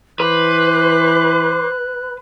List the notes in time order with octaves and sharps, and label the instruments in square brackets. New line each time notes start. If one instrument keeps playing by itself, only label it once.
[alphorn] E3 [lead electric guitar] B4 [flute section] C5 C6 D6 [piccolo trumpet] F#6